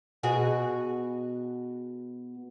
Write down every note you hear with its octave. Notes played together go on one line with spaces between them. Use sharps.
B2 F#4 G#4